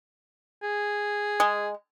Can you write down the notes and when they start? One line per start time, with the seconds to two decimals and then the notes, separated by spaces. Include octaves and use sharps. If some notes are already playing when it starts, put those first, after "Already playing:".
0.63 G#4
1.40 G#3